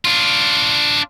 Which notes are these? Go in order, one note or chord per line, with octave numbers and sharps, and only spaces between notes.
D4 F4